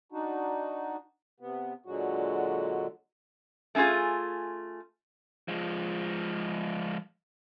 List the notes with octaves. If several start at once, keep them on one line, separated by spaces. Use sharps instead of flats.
D4 D#4 F#4
C3 B3
A#2 D3 F#3 G#3 F#4
A3 C#4 D#4 F4 G#4
F3 G#3